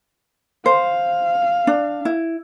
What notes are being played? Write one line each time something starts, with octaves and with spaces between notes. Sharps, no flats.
C5 F5
D4
E4